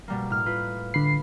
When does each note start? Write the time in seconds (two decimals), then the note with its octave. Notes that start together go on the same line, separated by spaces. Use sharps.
0.08 B2 G3 A#3
0.30 A2 F6
0.46 F4 B4
0.94 D3 B5 C7